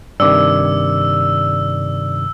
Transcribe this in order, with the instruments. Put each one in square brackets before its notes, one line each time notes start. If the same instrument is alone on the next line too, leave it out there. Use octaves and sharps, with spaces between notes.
[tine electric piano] G2 C3 D#3 [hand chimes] D5 D6 [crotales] E6